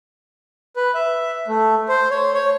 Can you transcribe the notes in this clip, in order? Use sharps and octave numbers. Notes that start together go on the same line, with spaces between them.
B4
E5
A3
C5
C#5
C#5